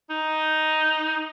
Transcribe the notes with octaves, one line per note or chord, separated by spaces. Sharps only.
D#4